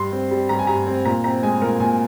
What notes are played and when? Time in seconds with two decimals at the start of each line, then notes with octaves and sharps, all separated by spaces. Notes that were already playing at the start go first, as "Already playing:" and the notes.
Already playing: G2 C6
0.12 C4
0.31 G3
0.49 G2 A#5
0.59 G#5
0.67 G2 A#5
0.87 C4
1.05 A#2 A#5
1.24 C4 A#5
1.43 G#3 G#5
1.62 A#2 A#4
1.80 A#2 G#5